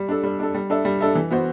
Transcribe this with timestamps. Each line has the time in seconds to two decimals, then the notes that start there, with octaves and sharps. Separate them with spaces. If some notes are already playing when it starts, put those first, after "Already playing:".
Already playing: G3
0.09 D4 A4
0.24 G3
0.39 D4 A4
0.54 G3
0.70 D4 A4 E5
0.85 G3
1.01 D4 A4 E5
1.15 E3
1.31 B3 F#4 C5